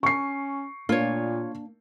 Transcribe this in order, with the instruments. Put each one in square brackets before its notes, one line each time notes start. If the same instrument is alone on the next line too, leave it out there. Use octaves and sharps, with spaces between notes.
[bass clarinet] C#4 [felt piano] C#6 C7
[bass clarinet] A#2 [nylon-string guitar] A#3 D4 [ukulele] F4 C#5